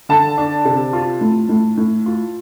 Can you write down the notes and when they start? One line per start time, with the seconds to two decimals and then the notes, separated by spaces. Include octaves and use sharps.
0.09 D3 A5
0.38 D4
0.65 C3
0.93 F4
1.21 A2
1.49 A2
1.77 A2
2.06 F4